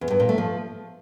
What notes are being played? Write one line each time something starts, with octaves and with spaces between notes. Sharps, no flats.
E2
G2
A#2
A3
F3